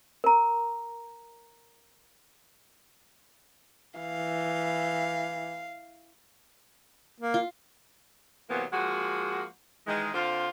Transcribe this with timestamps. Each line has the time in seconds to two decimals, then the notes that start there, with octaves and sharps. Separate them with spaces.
0.24 A#4 A#5
3.99 E3 F5
7.20 A#3
7.34 F4
8.49 C3 E3 F#3 A#3 B3
8.72 F3 G#3 A#3 F#4
9.87 D#3 E3 G#3
10.13 D3 C4 F4